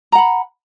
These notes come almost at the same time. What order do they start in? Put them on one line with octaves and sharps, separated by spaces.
A#5 F#5 B5